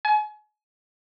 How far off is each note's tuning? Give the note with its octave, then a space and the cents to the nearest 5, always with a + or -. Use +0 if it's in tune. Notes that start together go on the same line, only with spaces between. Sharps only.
G#5 +35